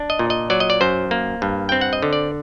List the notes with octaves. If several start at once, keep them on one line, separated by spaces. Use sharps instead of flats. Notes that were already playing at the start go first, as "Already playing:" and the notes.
Already playing: D4
D#5
A#2
D#5
F#3 D5
D#5
D5
F#2 C5
A#3
G2
C4 G5
F#5
D#5
D3
D5